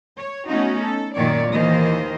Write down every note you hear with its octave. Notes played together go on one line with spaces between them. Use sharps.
C#5
A3 B3 C#4 D#4 F#4
A4
F#2 A#2 D#3 C#5 D5
D#2 D#3 E3 A#3 C5 D#5